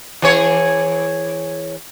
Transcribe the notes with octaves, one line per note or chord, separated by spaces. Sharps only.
E3 G#4 C#5